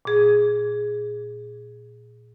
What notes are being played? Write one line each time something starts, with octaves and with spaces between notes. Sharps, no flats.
A#2 G#4